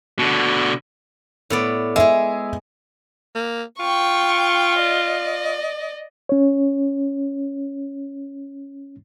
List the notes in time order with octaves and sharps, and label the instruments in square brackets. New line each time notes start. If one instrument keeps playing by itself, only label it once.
[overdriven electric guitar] B2 D3
[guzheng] A2 B3 D5
[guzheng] G#3 G#4 [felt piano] E5
[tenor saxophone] A#3
[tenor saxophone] F4 [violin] G5 C#6
[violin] D5 D#5
[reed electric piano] C#4 C#5